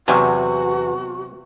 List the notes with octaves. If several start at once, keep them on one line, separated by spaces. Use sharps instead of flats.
E2 C3 F#3 F#4 G#5 C#6 F6